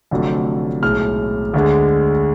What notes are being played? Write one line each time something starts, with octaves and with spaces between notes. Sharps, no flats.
F1 F2 D3 F#3 A3
B1 A2 G#3 F6
D2 D3 G#3